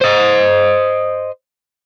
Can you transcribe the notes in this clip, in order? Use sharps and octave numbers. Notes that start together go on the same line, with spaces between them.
C5 D#5